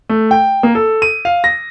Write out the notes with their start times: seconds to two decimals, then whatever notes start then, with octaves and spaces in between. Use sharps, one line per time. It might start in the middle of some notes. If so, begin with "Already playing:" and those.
0.09 A3
0.31 G5
0.63 A#3
0.75 A4
1.02 D#7
1.25 F5
1.44 A#6